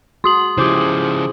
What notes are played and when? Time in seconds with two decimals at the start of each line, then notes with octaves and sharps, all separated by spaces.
0.24 F#4 G#4 C6 D#6 F#7
0.58 C#3 F3 E4 G4 G#4 C5 D6